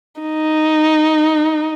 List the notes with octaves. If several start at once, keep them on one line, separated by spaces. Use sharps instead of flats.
D#4